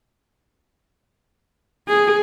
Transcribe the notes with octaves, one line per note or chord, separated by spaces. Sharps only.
G#4